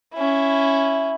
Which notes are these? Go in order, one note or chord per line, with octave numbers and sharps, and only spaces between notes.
C#4 E4